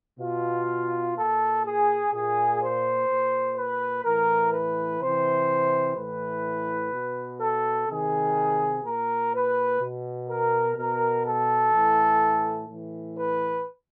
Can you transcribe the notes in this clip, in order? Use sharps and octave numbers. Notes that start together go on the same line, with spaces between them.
B2 F4
A#2 A4
G#4
A#2 G#4
C5
A#2
B4
A2 E3 A#4
B4
C3 E3 C5
A2 E3 B4
B2
A4
C3 D#3 G#4
A#2 A#4
B4
B2
A#4
B2 A#4
A4
A2 E3
A2 E3
B4